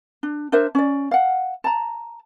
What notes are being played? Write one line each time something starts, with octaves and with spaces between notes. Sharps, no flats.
D4
D4 A#4 C5 E5
C#4 D5
F5 F#5
A5 A#5